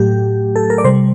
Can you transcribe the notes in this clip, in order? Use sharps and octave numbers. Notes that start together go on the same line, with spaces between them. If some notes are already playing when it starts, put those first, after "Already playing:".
Already playing: A2 F#3 A3 G4
A4
A#4
D5
C3 G3 C5